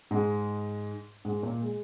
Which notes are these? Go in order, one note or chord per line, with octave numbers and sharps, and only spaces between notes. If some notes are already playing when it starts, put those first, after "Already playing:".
G#2 G#3
G#2 G#3
A#2 A#3
G#3